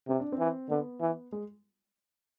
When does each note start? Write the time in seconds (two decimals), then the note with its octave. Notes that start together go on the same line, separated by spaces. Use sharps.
0.08 C3 C4
0.20 D4
0.32 C4
0.39 E3
0.70 D3 B3
1.01 E3
1.32 G#3